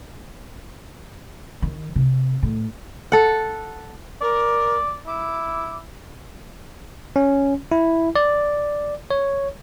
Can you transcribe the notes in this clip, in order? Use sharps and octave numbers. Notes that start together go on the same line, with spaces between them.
D#3
C3
A2
A4 F#5
A#4 D5
E4 D6
C#4
E4
D5
C#5